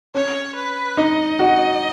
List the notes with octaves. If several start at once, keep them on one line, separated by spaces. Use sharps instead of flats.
C#4 C#5
B4
D#4 D#5
F#4